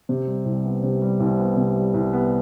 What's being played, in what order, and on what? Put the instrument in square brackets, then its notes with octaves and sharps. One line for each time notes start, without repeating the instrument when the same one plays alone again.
[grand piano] C3
G3
C2
B3
C3
G3
C2
B3
C3
G3
C2
B3